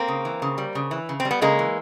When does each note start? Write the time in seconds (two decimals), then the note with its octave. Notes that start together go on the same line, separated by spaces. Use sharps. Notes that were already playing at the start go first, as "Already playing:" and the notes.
Already playing: A#3 C4
0.08 C#3
0.25 E3
0.42 C#3
0.58 G3
0.75 C#3
0.91 E3
1.09 C#3
1.20 C4
1.25 G3
1.31 B3
1.42 C#3 G#3 A#3
1.59 E3